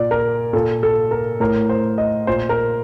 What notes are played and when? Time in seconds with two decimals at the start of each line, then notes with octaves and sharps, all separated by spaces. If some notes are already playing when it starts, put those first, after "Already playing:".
Already playing: A#2 D5
0.11 A#4
0.53 A#2 A4
0.83 A4
1.11 A#4
1.40 A2 A#4
1.69 C5
1.98 D#5
2.27 A#2 C5
2.49 A#4